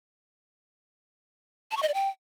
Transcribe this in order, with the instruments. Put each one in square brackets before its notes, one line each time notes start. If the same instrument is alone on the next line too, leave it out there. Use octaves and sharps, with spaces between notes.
[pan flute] A5
C#6
D#5
D5
G5